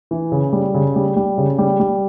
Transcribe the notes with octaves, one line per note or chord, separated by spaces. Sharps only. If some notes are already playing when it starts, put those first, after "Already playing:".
E3
C#3
G3
C#3
G3
G3
C#3
G3
G3